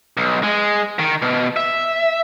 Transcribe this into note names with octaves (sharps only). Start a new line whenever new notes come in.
B1
G#3
D#3
B2
E5